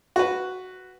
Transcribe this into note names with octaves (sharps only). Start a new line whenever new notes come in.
F#4 B4